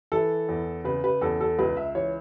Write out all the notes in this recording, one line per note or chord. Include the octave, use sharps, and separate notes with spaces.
E3 A4
E2
C#3 B4
B4
E2 A4
A4
C#2 B4
E5
E3 C#5